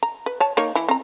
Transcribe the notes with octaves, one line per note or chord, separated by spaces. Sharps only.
A#5
B4
C#5 A5
A#3 D#4 C#5
E3 E4
C4 A#5